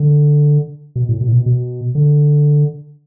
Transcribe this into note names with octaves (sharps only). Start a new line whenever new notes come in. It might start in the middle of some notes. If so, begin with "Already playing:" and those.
Already playing: D3
B2
A2
B2
A2
B2
B2
D3